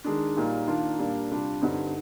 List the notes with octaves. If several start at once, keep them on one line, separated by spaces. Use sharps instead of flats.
D#3 G#3 D4
A#2 G3 A#3 D#4
D#3 A#3 D4 F4
A#2 G3 A#3 D4
C3 G3 D4 F4
G2 D3 G3 C4 D#4